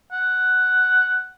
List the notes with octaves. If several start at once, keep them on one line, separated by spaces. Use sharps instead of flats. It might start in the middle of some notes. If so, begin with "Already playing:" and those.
F#5